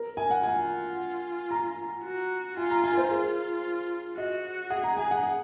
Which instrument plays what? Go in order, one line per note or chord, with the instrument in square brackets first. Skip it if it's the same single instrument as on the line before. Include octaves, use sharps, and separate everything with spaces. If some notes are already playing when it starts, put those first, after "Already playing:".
Already playing: [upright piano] A#4
G#5
F#5
[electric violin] F4 [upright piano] G#5
[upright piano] A#5
[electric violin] F#4
[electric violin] F4 [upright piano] G#5
[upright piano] A#5
G#5
A#4
C5
[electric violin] F4 [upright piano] G#4
[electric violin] F#4 [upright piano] D#5
[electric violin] G#4 [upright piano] F#5
[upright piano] A#5
G#5
F#5